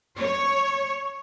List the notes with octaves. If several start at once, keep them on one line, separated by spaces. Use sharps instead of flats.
C#5